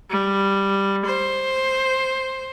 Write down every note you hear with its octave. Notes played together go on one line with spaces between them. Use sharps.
G3
C5